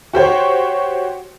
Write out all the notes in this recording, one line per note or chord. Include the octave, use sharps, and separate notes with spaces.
F#4 G4 C5 C#5